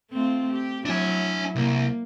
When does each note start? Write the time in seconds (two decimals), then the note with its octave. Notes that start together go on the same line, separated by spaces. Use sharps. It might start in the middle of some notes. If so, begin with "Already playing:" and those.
0.11 A3 C4 F4
0.53 G4
0.85 F#3 D4 E4 G#5
1.56 C2 A#3